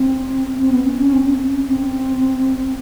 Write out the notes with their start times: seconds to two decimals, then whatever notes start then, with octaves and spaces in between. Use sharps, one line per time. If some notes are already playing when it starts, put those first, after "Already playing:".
Already playing: C4
0.58 C4
0.72 B3
0.86 C#4
0.99 C#4
1.13 C4
1.33 C4
1.39 C#4
1.67 C4